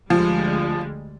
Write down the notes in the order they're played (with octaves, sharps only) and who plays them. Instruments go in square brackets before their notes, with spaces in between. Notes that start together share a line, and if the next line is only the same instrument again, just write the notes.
[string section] D2 G3 G#3 [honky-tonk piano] F3